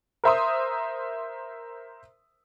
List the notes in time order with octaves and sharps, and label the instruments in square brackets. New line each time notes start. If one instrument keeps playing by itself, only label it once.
[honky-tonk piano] A#4 C5 E5 A#5 C6 D#6